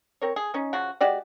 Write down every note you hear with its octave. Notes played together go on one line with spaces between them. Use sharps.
C4 A#4 C#5
G#4
C#4 D#4
C#3 F3 F#4
G#3 F#4 G4 D5